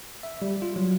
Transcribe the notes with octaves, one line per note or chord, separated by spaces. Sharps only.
E5
G3
F4
F#3